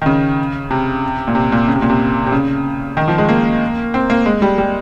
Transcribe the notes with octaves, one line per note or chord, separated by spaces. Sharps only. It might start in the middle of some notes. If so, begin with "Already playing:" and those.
D#3
C#3
C3
A#2
C3
A#2
C#3
C3
A#2
C3
C3
C#3
D#3
F3
G#3
A#3
C4
A#3
G#3
G3
G3